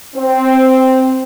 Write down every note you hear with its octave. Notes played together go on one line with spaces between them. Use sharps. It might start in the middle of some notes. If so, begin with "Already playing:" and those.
C4